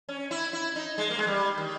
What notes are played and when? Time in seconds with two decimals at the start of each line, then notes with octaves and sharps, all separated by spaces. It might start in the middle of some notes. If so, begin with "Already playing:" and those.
0.09 C#4
0.31 E4
0.53 E4
0.76 D#4
0.98 G#3
1.10 A#3
1.18 G#3
1.27 G3
1.57 D#3